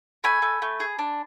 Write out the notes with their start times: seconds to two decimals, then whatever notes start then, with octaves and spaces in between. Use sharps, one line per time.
0.24 A3 G#5 B5
0.42 A3
0.62 A3
0.80 G#4
0.99 D4